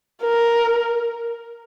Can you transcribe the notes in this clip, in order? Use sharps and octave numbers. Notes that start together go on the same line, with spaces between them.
A#4